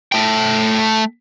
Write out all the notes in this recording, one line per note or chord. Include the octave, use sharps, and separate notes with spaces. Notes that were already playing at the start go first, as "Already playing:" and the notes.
A3 G5